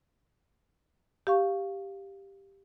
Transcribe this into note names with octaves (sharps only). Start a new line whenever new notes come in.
G4 F5 C#6